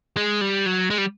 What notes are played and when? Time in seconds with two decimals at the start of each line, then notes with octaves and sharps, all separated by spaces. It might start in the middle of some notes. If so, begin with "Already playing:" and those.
0.17 G#3
0.41 G3
0.66 F#3
0.90 G#3
0.98 G3